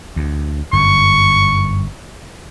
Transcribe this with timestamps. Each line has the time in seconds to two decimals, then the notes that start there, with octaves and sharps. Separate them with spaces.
0.16 D2
0.73 G1 F#2 C#6